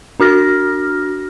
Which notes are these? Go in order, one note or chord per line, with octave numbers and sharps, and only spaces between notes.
D4 F#4 F6 A#6